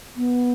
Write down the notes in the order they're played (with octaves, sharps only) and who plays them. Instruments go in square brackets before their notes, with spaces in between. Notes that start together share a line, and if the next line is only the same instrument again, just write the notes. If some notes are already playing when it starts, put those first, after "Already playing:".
[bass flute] B3